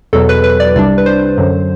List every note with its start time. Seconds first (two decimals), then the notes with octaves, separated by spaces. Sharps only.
0.13 E2 B2 F#3 A4
0.29 B4
0.44 B4
0.60 D5
0.75 C2 C3 G3 D4 D5
0.98 B4
1.06 C5
1.38 F#2 D3 F#3